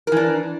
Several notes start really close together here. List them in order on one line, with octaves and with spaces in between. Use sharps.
A#4 E3 D4